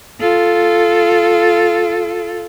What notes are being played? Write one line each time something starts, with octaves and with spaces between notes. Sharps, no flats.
F4 A4